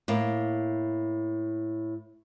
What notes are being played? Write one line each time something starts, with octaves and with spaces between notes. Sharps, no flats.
A2 A#3